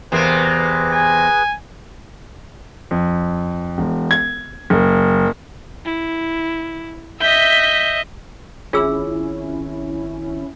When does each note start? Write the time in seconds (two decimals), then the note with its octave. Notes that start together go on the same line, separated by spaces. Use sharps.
0.12 E2 C3 A#3 G#4 B4 C5
0.92 G#5
2.91 F2
3.78 E1
4.11 G#6
4.70 F#1
5.85 E4
7.20 D#5 E5 G6 B6
8.73 G#1 C#4 E4 F4 G#4 E6